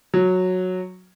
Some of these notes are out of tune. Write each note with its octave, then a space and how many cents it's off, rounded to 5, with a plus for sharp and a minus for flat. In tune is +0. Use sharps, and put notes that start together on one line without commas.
F#3 -10